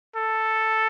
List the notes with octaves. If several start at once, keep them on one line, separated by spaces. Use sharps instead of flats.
A4